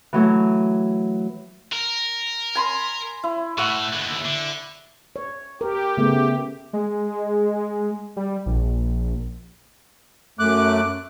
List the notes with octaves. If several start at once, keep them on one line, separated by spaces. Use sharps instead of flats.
E3 F#3 A3
A#4
G#5 B5 C6
E4
A2 E5 F#5 C#6
D#2 D3
D3
C#5
G4 A#4
C#3 A3 B3
G#3
G3
A#1
F#2 A3 D6 F#6